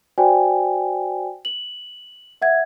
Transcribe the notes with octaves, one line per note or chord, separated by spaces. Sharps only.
F#4 C5 D5 G5 G#5
F#7
E5 F#5 G#6